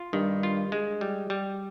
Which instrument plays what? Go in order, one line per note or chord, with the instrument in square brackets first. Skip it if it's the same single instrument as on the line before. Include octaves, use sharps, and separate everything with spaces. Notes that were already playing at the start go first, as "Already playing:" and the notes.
Already playing: [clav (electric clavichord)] F4
[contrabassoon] G2 [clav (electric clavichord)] D#3
[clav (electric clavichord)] F4
G#3
G3
G3